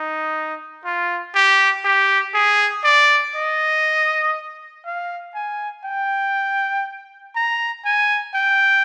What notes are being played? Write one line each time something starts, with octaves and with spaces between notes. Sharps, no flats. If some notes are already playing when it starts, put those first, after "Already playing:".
Already playing: D#4
F4
G4
G4
G#4
D5
D#5
F5
G#5
G5
A#5
G#5
G5